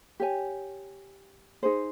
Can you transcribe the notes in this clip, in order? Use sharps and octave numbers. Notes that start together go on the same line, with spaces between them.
G4 C#5 G#5
D#4 G#4 C5